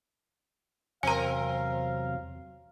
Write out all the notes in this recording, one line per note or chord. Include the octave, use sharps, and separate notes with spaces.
E2 C3 F#3 C4 A#4 F5 G#5 A#5